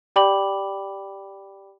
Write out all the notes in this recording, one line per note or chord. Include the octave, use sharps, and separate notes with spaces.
G4 D5 G5 B5 D6 F#7